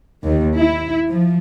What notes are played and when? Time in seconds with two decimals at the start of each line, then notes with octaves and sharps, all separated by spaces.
0.24 D#2
0.57 E4
1.09 F3